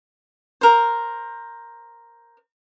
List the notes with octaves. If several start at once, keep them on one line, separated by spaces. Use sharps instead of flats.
A#4 C5